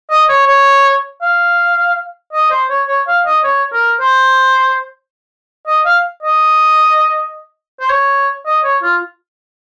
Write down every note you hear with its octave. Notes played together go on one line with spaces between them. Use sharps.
D#5
C#5
C#5
F5
D#5
C5
C#5
C#5
F5
D#5
C#5
A#4
C5
D#5
F5
D#5
C5
C#5
D#5
C#5
F4